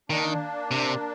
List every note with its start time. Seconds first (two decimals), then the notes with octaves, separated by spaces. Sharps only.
0.10 D#3 A#3 D4
0.71 C3